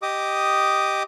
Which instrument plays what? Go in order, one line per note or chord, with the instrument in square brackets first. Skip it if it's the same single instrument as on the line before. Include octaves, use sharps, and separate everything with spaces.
[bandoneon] G4 D#5 D6 D#6